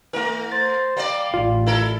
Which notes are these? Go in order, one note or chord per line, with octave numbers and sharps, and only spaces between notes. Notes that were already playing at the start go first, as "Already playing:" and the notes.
E3 A3 A#4
C5 A6
G3 A#3 D5
A1 F4
E4 A4 A#4